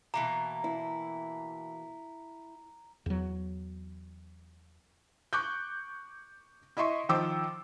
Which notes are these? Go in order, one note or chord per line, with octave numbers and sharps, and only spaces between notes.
B2 E3 A#3 A#5
E4
E2 F#3
C#6 D6 F#6 G6
E4 D#5 E5 C6 C#6
D#3 F3 C5 D6 E6